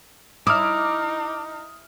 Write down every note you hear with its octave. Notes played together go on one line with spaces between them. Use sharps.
D#4 E4 D6 D#6 F6